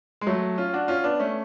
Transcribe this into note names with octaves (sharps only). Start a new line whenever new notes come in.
G#3
F#3 A3
C#4 F4
D4 F#4
C#4 F4
B3 D4
A3 C#4